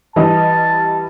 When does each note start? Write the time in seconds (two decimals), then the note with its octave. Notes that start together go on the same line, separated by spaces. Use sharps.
0.16 E3 G3 D#5 A5